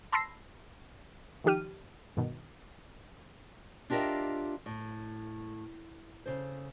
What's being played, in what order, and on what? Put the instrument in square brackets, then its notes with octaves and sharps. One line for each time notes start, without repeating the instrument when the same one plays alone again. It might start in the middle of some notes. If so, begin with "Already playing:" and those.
[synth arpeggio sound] A5 B5 C6 E6 A#6 C7
D#3 F3 D#4 G4 F6 D#7
G2 B2 D#3
[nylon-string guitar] D4 F4 G4 A#4 D#5 E5
A2
C#3 A4 C5